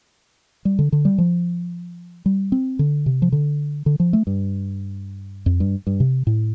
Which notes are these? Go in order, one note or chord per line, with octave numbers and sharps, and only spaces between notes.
G3
D3
D3
G3
F3
G3
C4
D3
C3
F3
D3
D3
F3
A3
G2
F2
G2
G2
C3
A2